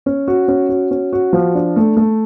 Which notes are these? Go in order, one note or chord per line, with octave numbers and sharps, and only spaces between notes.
C#4
F#4
C#4
F#4
C#4
F#4
F3
D4
A3
A3